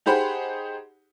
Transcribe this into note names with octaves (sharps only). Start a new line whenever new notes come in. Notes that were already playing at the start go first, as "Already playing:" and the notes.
D#4 G4 G#4 C5 F#5 B5